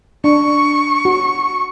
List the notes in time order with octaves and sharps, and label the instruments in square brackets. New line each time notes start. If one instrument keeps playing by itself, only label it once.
[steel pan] D4 [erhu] C#6
[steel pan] F#4